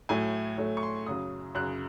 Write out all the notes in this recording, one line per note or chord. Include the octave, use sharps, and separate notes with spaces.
A2 F#3 A3 G#5
A2 F#3 A3 C#5
C#6
C6
F#2 C#3 F#3 D#6
F#2 C#3 F#3 F#6